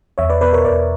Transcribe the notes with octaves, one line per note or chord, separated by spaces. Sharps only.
E2 C#5 E5
B4 D5
B2 B4 D5
A#4 C#5
E2 B4 D5